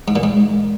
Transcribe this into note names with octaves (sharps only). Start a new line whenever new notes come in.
G#2
A#2
G#2